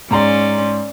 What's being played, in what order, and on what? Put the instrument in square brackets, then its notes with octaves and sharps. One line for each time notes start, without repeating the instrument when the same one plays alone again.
[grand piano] G#2 A#5 C6 [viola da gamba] C#4 D5